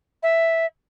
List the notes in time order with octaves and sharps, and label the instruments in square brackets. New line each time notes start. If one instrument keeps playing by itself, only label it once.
[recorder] E5